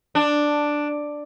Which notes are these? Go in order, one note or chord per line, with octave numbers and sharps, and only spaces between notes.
D4